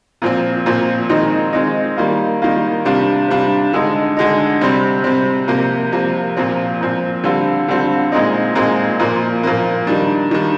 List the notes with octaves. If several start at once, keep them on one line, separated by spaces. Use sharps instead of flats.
A#2 F3 C4
A#2 F3 C4
D#3 G#3 C4 D#4
D#3 G#3 C4 D#4
D#3 G3 A#3 F4
D#3 G3 A#3 F4
C3 G3 D4 F4
C3 G3 D4 F4
D3 G#3 D#4
D3 G#3 D#4
C3 G3 C4
C3 G3 C4
C3 F3 A#3
C3 F3 A#3
A#2 F3 C4
A#2 F3 C4
D3 G3 C4 F4
D3 G3 C4 F4
A#2 G#3 C4 D#4
A#2 G#3 C4 D#4
A#2 F3 A#3
A#2 F3 A#3
D#3 G3 D4
D#3 G3 D4